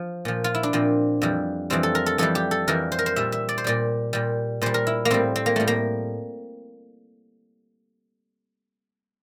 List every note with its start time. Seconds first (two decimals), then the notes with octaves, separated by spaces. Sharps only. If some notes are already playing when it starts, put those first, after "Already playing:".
Already playing: F3
0.25 A#2 F3
0.44 F4
0.55 E4
0.63 D4
0.73 A#2 F3 C4
1.22 F2 E3 G3
1.70 F2 E3 G3 C4
1.83 A4
1.95 A#4
2.06 A4
2.18 F2 E3 G3 A4
2.35 G4
2.51 A4
2.68 F2 E3 G3 A#4
2.92 C5
2.99 A#4
3.06 C5
3.16 A#2 G3 E5
3.32 E5
3.49 D5
3.58 C5
3.64 A#2 G3 D5
4.13 A#2 G3
4.62 A#2 G3 C5
4.74 A#4
4.87 E4
5.05 A#3
5.10 A2 G3 C4
5.36 C4
5.46 A#3
5.56 A2 G3 A3
5.68 A#3